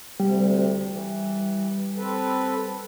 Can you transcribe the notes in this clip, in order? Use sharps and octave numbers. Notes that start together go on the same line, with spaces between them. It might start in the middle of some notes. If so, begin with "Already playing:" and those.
D2 C3 G3
E3
C4 A4 B4